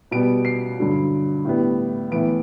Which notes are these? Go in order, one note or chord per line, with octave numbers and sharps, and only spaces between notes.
B2 G3 B3 D7
C7
G2 D3 F#3
A2 G3 B3
A2 E3 B3 D7